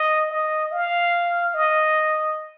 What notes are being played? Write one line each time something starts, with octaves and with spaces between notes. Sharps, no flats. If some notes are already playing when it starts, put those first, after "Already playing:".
Already playing: D#5
D#5
F5
D#5